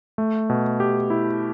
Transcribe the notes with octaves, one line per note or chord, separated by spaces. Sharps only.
A3
B2
G4
E4